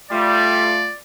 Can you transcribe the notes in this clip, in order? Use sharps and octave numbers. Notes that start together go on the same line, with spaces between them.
G3 A3 F4 D5